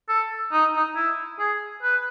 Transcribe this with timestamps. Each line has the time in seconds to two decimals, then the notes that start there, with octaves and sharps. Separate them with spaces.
0.09 A4
0.52 D#4
0.77 D#4
0.96 E4
1.39 G#4
1.83 B4